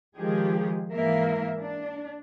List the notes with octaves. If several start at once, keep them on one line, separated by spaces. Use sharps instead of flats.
D#3 F3 G#3 G4 G#4
G#2 E3 A#3 A#4 E5
D4